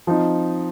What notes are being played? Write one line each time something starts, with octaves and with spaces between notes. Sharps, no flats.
F3 C4 D#4